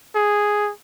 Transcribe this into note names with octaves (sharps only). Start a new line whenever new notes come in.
G#4